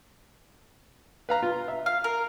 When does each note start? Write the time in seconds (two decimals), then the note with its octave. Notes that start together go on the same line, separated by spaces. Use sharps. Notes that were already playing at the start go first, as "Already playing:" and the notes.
1.29 B4 F5 A#5
1.42 F4
1.68 E5
1.86 F5
2.04 A#4